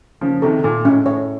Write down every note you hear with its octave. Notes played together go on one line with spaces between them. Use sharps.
C#3 F3 A#3
C3 D#3 A4
A#2 A4
A2 C#4
A2 C#5